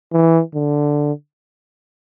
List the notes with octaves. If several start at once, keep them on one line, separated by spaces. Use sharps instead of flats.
E3
D3